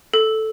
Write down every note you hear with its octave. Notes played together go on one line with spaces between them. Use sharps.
A4